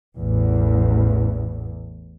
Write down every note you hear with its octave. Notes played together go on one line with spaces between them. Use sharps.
A1 E2